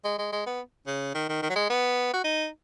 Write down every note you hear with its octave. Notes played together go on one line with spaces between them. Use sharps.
G#3
G#3
G#3
B3
C#3
D#3
D#3
D#3
F#3
G#3
B3
F#4
D#4